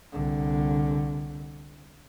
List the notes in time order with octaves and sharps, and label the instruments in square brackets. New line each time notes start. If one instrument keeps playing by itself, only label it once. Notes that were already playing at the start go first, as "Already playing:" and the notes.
[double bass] C2 D3